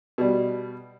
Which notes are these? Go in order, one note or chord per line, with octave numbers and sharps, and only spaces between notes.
B2 G3